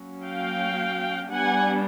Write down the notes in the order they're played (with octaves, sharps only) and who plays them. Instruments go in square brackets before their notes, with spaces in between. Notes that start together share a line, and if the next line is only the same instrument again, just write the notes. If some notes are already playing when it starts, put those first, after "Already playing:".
Already playing: [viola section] F#3 A#3 C#4
F5 G5
G3 B3 D4 F#5 G#5